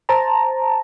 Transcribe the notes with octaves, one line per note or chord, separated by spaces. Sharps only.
C5 A5 A#5